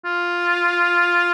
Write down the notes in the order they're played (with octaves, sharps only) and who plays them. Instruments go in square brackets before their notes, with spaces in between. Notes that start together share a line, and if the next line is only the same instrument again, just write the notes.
[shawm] F4